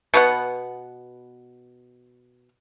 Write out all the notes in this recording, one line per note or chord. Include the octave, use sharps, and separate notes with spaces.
B2 B3 F#5